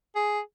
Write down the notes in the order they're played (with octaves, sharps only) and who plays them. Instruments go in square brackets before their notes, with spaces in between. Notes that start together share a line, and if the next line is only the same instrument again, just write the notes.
[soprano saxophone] G#4